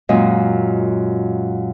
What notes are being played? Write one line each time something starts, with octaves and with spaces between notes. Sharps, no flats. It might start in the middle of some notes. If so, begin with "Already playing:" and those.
F#2 A#2 G#3 D#5